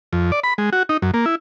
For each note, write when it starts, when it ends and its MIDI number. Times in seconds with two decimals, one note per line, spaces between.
0.13 0.31 41
0.32 0.40 74
0.44 0.54 83
0.58 0.70 56
0.73 0.83 66
0.89 0.97 63
1.02 1.11 42
1.14 1.25 58
1.26 1.35 64